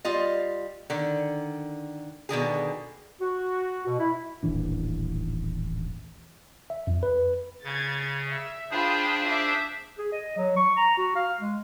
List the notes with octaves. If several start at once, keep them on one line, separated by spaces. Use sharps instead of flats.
G3 F4 D#5
D3 D#3
B2 D3 D#3 G#4
F#4
B2
E4
D#1 A1 E3 D4
E5
F2
B4
C#3 G#6 A6
E5
D4 F4 G#4 C5 G5 B5
E5 D6
G#4
D#5
F#3
C#6
A#5
F#4
F5
G#3